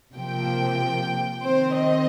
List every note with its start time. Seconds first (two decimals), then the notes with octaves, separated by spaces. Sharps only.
0.15 C3 F3 A#3 G5
1.43 D#3 C4 C5
1.75 D#5